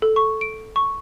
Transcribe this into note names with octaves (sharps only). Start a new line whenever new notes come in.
A4
C#6
D7
C#6